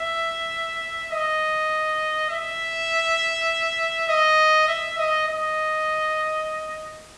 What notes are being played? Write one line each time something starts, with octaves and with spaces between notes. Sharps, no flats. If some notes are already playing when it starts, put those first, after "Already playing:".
Already playing: E5
D#5
E5
D#5
E5
D#5
D#5